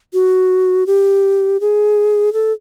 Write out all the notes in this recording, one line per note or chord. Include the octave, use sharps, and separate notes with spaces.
F#4
G4
G#4
A4